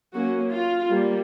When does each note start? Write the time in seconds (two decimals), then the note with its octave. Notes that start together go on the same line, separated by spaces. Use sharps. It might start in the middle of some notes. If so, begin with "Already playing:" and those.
0.14 F#3 A#3 C#4 F#4
0.52 F4
0.91 G3 A#3